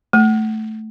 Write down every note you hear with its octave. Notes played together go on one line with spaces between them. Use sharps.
A3